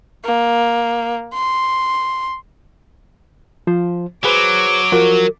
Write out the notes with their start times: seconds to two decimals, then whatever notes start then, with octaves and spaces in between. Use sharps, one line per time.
0.25 A#3
1.34 C6
3.67 F3 C5
4.24 F#3 G#4 B4 C5 D6
4.92 F3 F4 F#4 A#4